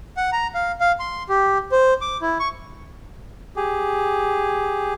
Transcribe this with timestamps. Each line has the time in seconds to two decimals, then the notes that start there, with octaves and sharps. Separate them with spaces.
0.17 F#5
0.32 A#5
0.54 F5
0.81 F5
1.00 C6
1.29 G4
1.72 C5
2.01 D6
2.22 E4
2.40 C#6
3.56 G4 G#4